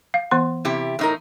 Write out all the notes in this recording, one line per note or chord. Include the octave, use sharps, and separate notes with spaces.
F5
E3 B3 C6
C3 E4 G4
A2 D#4 A#4